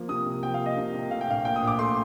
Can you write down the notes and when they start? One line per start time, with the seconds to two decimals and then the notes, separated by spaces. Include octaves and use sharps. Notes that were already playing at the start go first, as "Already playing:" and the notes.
Already playing: F3 A#3
0.09 C3 D#6
0.26 C2
0.43 F3 G5
0.54 F5
0.60 A#3
0.66 D#5
0.77 C3
0.94 C2
1.11 A3 F5
1.21 G5
1.28 A#1 F5
1.45 A#2 G5
1.56 D#6
1.62 A#1
1.67 D6
1.79 A3 C6